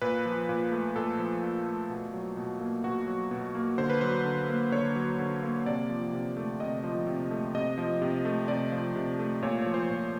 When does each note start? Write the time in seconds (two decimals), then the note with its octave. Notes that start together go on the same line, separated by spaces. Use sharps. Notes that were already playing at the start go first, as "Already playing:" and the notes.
0.02 A#2 B4
0.25 F3
0.49 A#2
0.72 A3
0.96 A#2 A4
1.19 F3
1.43 A#2
1.66 A3
1.90 B2
2.13 F#3
2.37 B2
2.60 A#3
2.84 B2 F#4
3.07 F#3
3.31 B2
3.55 A#3
3.78 D3 C5
3.90 B4
4.01 F#3 C5
4.25 D3
4.49 A#3
4.72 D3 C#5
4.96 F#3
5.19 D3
5.43 A#3
5.66 C3 D5
5.90 F3
6.13 C3
6.37 A3
6.60 C3 D#5
6.84 F3
7.07 C3
7.31 A3
7.55 C3 D#5
7.78 F3
8.02 C3
8.25 A3
8.48 C3 D5
8.72 F3
8.96 C3
9.19 A3
9.42 A#2 C#5
9.62 F3 C#5
9.74 C5
9.89 A#2